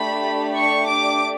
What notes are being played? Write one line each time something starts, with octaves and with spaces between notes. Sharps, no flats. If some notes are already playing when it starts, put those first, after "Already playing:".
Already playing: A3 D4 G4 B5
C#6
D6